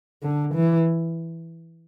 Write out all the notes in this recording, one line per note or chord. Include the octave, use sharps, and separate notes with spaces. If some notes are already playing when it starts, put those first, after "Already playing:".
D3
E3